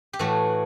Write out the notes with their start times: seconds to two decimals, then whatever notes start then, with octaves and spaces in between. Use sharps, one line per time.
0.13 G4
0.19 A2 E3 A3 F#4